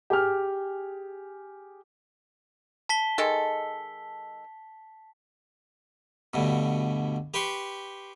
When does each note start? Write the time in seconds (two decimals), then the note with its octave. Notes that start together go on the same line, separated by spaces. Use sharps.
0.10 G4 G#4 G#5 F6
2.89 A5 B6 G7
3.18 D#3 G#3 A4
6.34 D2 G2 B2
7.34 G4 B4 G5 C6 C#6